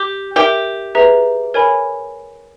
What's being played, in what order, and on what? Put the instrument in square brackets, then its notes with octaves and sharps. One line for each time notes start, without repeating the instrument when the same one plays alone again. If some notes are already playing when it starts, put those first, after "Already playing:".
Already playing: [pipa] G4
[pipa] G4 [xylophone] A#4 E5 G5
[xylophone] G#4 B4 E5 A#5
A#4 C#5 G#5 B5